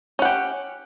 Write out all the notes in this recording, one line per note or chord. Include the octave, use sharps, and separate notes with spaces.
C#4 G4 F#5